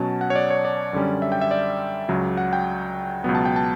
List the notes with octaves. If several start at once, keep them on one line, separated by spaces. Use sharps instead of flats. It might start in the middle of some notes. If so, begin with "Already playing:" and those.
Already playing: B2 F#3 C#4 A5
F#5
C#5
D5
C#5
D5
F#2 D3 G3 C#4
E5
G5
E5
D5
C#2 C#3 F#3
F#5
G5
C#2 B2 F#3 B3
A5
G5
A5